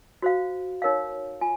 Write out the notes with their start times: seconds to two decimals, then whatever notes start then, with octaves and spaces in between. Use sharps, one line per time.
0.22 F#4 C5 F5
0.82 D#4 A#4 C#5 F5
1.41 F4 G#5